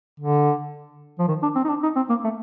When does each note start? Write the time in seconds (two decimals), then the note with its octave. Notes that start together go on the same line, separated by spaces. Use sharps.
0.20 D3
1.19 F3
1.28 D#3
1.43 D4
1.55 C4
1.64 D#4
1.69 D4
1.83 D#4
1.96 C4
2.09 A#3
2.24 A3